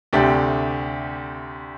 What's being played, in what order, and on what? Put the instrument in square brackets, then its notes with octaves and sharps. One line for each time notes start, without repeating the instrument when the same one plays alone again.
[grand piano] D2 C3 A3 D4 G4